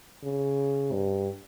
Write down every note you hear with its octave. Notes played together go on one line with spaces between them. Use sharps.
C#3
G2